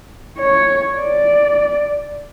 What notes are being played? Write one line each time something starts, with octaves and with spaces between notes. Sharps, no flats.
C#5
D5